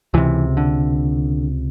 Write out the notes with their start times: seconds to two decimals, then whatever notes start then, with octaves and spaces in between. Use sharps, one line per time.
0.14 C#2 C3 E3
0.57 D3